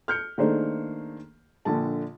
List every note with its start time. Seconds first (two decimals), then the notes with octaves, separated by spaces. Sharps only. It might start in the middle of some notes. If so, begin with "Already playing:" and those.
0.08 F6 G6 C#7
0.38 D#3 A3 A#3 D4 G#4 C5
1.65 A#1 D3 A5